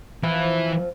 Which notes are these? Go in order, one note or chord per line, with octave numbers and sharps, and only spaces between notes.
E3 F3 C4 E4